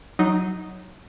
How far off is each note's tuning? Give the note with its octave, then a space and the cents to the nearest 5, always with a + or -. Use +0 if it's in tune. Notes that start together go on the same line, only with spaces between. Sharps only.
F#3 +0 D#4 +0 D#5 +0